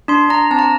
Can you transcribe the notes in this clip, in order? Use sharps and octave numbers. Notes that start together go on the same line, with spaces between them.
D4 C6
D4 A#5
C4 A5
A#5